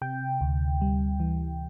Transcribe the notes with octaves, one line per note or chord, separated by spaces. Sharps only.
C3 G5
D2
G3
E3